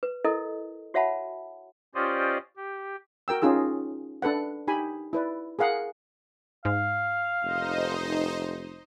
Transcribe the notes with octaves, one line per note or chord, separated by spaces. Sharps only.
B4
E4 A4 A#4 D#5
F#4 C#5 E5 F#5 A5 B5
C#4 F4 G4 C5 D5 D#5
G4
F#4 A#4 G5 E6
C#4 D#4 F4 G#4 E6
D4 A4 B4 F#5
D#4 G4 G#5 B5
E4 B4 D5
G#4 A#4 F5 F#5
G#2 F5
F1 D#4 C5 D#5